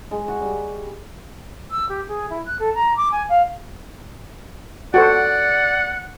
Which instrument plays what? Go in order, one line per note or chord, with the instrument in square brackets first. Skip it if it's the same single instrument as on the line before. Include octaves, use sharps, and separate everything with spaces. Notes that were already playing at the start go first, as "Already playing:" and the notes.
[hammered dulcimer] G#3
F#4
G3
[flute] E6
G4
G#4
E4
F#6
A4
A#5
D6
G#5
F5
[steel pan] F#4 A4 C5 [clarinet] D5 [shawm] F#5